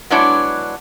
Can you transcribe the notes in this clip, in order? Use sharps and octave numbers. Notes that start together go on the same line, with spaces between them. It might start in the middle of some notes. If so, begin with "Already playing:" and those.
F#3 G#3 B3 D4 E4 C#5